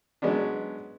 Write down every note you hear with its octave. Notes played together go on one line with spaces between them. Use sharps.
F#3 G#3 B3 C#4 D4